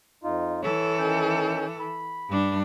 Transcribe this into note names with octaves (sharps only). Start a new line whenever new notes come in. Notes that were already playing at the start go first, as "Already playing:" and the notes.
F2 D#4 F4
E3 A4 C#5
D#3 C#4 G6
B5
G2 D4